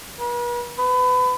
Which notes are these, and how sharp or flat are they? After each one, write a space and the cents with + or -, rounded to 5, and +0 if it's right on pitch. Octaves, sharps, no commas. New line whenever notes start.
B4 -45
B4 +30